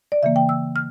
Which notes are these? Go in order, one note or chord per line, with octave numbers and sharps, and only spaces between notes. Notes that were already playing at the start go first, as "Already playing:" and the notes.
D5
C#3 E3 A#3 E5
G5
E6
F6